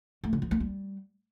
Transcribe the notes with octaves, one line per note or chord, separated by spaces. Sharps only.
A3
D3
F3
A#3
G3